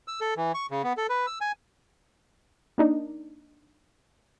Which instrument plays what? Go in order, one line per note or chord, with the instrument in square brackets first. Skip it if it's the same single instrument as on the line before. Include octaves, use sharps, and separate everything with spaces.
[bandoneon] E6
A4
E3
C#6
C#3
B3
A4
B4
E6
G#5
[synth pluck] A#3 D4 D#4